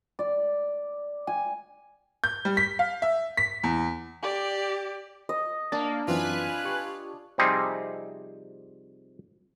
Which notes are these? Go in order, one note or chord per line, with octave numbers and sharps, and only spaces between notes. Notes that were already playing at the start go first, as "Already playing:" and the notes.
D5
G#5
G6
G3
B6
F5
E5
B6
E2
G4 D5
D#5
A#3 D4 A6
F#2 E3 C4 F4 B4 G#5 F#6
G4 C#6
C3 F3 G3 C4 D#4 G#4